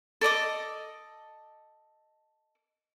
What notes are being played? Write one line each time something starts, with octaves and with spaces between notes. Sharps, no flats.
A4 D5 D#5 D6